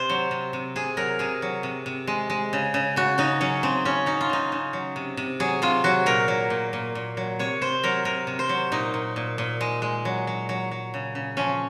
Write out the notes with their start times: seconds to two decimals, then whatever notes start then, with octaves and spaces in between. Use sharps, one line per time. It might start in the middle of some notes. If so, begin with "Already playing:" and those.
Already playing: C3 C5
0.09 F#3
0.31 C3
0.53 C3
0.76 C3 G#4
0.97 F#3 A#4
1.19 C3 G#4
1.42 F#3
1.63 C3
1.86 C3
2.07 G#3
2.30 G#3
2.53 C#3
2.74 C#3
2.96 C#3 F#4
3.18 C#3 D#4
3.41 F#3 C#4
3.63 C#3 C4
3.85 C#3 C#4
4.06 F#3 D#4
4.21 F4
4.29 C#3 D#4
4.52 C#3
4.73 F#3
4.96 C3
5.17 C3
5.40 F#3 G#4
5.62 C3 F4
5.84 F#3 F#4
6.06 A#2 A#4
6.28 F#3
6.50 A#2
6.73 A#2
6.95 A#2
7.17 F#3
7.39 C3 C#5
7.61 C3 C5
7.83 F#3 A#4
8.05 C3 A#4
8.27 C3
8.39 C5
8.49 F#3
8.72 A#2 D#4
8.94 A#2
9.16 A#2
9.38 A#2
9.61 G#3
9.82 G#3
10.05 F#3
10.27 F#3
10.49 F#3
10.71 F#3
10.94 C#3
11.15 C#3
11.37 F3 C#4